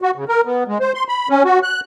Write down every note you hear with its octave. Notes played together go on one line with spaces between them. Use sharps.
F#4
C#3
A#4
B3
G#3
C5
C6
B5
C#4
F#4
F#6